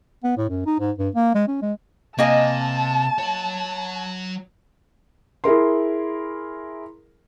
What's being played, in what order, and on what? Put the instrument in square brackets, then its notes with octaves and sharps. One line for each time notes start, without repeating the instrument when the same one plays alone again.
[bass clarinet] B3
A2
F#2
D#4
G#2
G2
A#3
G#3
C#4
G#3
[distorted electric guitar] C3 [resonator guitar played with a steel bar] A#3 D#5 G#5 [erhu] A5
[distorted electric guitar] F#3 C#5
[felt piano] E4 G#4 A#4 C6